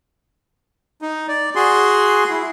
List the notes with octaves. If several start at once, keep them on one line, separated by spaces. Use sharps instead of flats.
D#4
D5
F#4 G#4 C6
E4